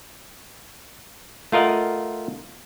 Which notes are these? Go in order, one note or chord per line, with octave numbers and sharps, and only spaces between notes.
A3 F4 A#4 D#5 F#5